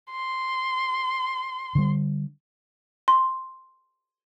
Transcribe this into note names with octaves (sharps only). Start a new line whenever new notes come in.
C6
D3 G3
C6